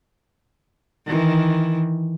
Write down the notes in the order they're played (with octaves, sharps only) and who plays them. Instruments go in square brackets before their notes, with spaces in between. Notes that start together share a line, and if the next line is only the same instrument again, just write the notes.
[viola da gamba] D#3 E3